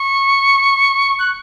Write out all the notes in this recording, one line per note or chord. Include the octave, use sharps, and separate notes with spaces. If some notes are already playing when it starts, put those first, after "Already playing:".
Already playing: C#6
F#6